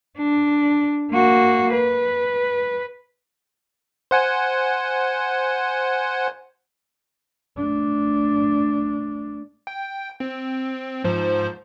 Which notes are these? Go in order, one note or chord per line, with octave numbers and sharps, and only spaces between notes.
D4
A#3 F#4
B4
C5 F#5 G#5
A3 D4
G5
C4
G#2 F3 C5